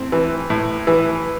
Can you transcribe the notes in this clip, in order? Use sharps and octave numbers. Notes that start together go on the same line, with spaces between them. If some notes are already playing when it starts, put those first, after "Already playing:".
Already playing: A2 C4
E3
A2
E3